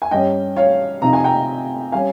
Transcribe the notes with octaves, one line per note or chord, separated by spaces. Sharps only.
G#5
G2 G3 C#4 D#5 G5
C#5 F5
C3 F3 C4 D#4 A#5
G#5
G5 A#5
G3 C#4 F5 G#5